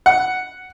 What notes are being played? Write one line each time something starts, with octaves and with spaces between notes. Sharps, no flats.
F#5